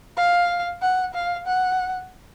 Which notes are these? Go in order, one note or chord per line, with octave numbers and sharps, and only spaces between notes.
F5
F#5
F5
F#5